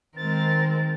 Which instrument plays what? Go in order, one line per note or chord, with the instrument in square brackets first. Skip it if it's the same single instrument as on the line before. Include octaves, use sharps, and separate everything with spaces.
[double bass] D#3 [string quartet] G#3 C4 A#4 [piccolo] A6